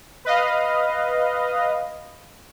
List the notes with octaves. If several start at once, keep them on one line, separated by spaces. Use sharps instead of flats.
B4 D#5 F5